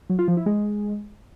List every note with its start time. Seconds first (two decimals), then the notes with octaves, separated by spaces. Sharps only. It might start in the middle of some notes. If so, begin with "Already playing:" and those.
0.10 F#3
0.19 F4
0.28 F3
0.37 E4
0.46 G#3